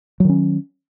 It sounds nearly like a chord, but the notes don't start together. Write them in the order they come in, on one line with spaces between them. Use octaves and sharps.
F#3 D#3 C#4